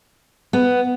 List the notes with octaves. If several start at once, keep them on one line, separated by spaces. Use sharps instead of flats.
B3